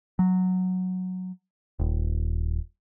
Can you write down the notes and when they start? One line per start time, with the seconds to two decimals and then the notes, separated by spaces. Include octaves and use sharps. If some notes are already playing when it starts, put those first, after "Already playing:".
0.19 F#3
1.79 D#1